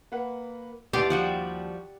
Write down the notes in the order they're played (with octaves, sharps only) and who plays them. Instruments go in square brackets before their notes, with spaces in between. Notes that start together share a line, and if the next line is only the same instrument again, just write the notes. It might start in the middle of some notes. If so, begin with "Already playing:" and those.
[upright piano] A#3 B4 F#5
[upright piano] D#2 [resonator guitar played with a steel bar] E3 B3 [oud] G4 [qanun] D5 C6
[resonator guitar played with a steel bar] F3 G3 F#4 [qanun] F#5